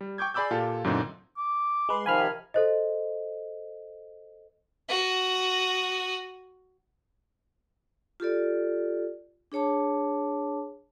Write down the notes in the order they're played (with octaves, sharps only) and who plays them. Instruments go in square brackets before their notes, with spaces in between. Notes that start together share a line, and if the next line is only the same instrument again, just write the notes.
[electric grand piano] G3
G5 C#6 D6 G6 G#6
G#4 D5 B5 D6 E6 G6
A#2 F4 G4 A4
F#2 A#2 D3 A#3 C4 D#4
[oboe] D6
[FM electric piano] G#3 B4 [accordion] C6
[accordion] C3 D#3 F3 [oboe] F5 [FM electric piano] G#5 B5 F6
[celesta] A4 C5 D#5
[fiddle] F#4 D#6
[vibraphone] F4 G4 A4 D5
D4 G#4 C#5 A5 D6